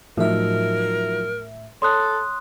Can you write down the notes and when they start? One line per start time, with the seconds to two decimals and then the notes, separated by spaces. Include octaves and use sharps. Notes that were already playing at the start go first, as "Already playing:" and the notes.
0.17 A2 F3 F#3 D#4 A#4 E5
1.82 A4 C#5 C6 D#6 F#6